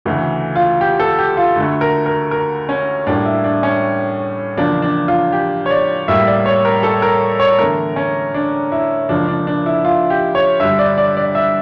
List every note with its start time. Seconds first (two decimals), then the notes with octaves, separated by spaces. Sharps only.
0.05 D2 C#3 E3 A3
0.55 F4
0.81 G4
1.00 A4
1.18 G4
1.37 F4
1.56 D2 D3 A3
1.81 A#4
2.06 A#4
2.31 A#4
2.69 C#4
3.07 A2 G3 A#3 D4
3.25 E4
3.44 D4
3.63 C#4
4.57 E2 C#3 F3 A#3 D4
4.82 D4
5.08 F4
5.32 G4
5.66 C#5
5.71 D5
6.08 A2 G3 A#3 E5
6.27 D5
6.46 C#5
6.65 A#4
6.83 A4
7.02 A#4
7.40 C#5
7.59 E2 D3 A3 A#4
7.96 C#4
8.34 D4
8.72 E4
9.09 C#2 C#3 F3 A#3 D4
9.28 D4
9.47 D4
9.66 E4
9.85 F4
10.10 G4
10.35 C#5
10.60 G2 D3 G3 E5
10.79 D5
10.98 D5
11.17 D5
11.35 E5